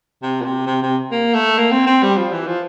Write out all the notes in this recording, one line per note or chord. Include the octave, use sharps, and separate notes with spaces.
C3
A#2
C3
C3
C3
A#3
A3
A#3
C4
C4
G3
F3
E3
F3